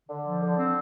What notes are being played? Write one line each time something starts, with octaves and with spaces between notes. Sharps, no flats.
D3
F3
D3
C4